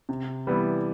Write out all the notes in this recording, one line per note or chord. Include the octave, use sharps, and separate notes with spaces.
C3
E3 G3 B3 E4